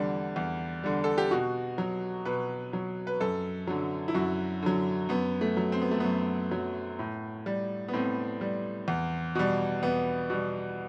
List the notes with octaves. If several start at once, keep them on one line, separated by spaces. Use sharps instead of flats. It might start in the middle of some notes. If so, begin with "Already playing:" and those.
Already playing: E2 D3 G3
E2
D3 G3
A4
G4
B2 F#4
F#3
B2 B4
F#3
B4
F#2 A4
D3 F#3
E4
F#2 F#4
D3 F#3
F#2 B3
A3
F#3
C4
B3
A3
F#2 B3
F#3
A2
G3
B3
A2 C4
G3
E2
B2 G3
E2 B3
B2 G3